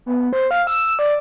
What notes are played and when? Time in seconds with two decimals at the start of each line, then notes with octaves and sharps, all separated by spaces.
0.06 B3
0.33 C5
0.51 F5
0.67 E6
0.99 D5